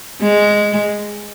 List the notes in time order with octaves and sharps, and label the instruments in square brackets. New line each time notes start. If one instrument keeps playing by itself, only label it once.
[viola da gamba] G#3